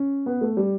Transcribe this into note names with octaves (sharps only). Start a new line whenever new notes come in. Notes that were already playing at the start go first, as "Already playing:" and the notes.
Already playing: C#4
B3
A3
G3